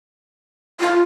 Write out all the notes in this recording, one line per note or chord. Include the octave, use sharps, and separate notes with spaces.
F4